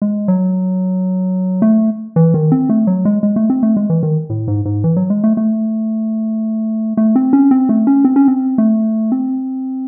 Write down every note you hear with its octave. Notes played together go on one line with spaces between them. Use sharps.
G#3
F#3
A3
E3
D#3
C4
A3
F#3
G#3
G#3
A3
C4
A3
G#3
E3
D#3
A2
G#2
G#2
E3
F#3
G#3
A3
A3
A3
C4
C#4
C4
A3
C#4
C4
C#4
C4
A3
C4